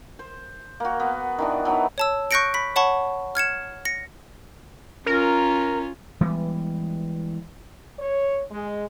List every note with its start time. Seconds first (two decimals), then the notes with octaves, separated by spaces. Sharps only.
0.19 C5
0.80 A#3 F#4
1.00 B3
1.38 D#3 E3 D4
1.65 E3 F#3 B3 D#4
1.98 C#5 A5 E6
2.31 C#6 F#6 G6 A#6 C#7 D7
2.54 B5 B6
2.76 C#5 F#5 A5 B5 C#6
3.35 F6 G#6 C#7 E7
3.85 A#6 C#7
5.06 C#4 F4 A#4
6.21 E3 G3 G#3 B3
7.99 C#5
8.51 G#3